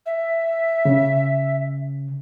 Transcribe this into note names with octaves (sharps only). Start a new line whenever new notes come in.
E5
C#3